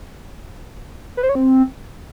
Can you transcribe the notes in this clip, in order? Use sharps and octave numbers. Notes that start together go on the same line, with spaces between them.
B4
C5
C#5
C4